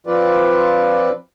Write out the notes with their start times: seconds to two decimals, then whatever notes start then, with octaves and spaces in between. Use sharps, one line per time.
0.07 F3 C4 F4 B4 D5